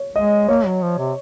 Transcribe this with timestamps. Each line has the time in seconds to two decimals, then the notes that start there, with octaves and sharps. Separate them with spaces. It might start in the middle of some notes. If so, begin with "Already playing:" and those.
Already playing: C#5
0.16 G#3 D#5
0.48 A#3 C#5
0.66 F#3
0.82 F3
0.98 C3